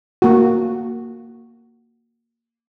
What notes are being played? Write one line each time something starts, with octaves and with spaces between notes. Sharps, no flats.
A#3 F#4